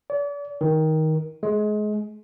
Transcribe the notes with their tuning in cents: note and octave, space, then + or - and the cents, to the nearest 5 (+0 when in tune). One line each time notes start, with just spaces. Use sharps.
D5 -40
D#3 +15
G#3 +25